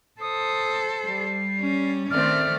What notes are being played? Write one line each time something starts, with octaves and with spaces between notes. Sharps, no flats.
A4 C5 D#6
G3 C7
C#4
D#3 A3 C4 D5 F6